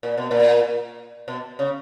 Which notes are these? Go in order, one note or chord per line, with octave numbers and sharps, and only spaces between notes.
A#2
B2
A#2
B2
C#3